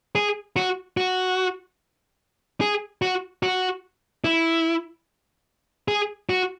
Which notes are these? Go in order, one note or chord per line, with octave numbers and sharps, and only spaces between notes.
G#4
F#4
F#4
G#4
F#4
F#4
E4
G#4
F#4